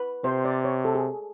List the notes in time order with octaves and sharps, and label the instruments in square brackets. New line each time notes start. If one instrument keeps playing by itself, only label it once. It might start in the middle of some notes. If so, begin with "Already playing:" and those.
Already playing: [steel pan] B4
[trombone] C3 [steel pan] C5
[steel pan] D5
C#5
A4
G#4